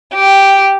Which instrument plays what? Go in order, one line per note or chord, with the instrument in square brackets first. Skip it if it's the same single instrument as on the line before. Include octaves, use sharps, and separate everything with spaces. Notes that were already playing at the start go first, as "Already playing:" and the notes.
[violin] G4